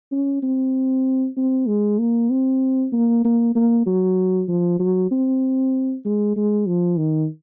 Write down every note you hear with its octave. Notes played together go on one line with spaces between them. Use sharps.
C#4
C4
C4
G#3
A#3
C4
A#3
A#3
A#3
F#3
F3
F#3
C4
G#3
G#3
F3
D#3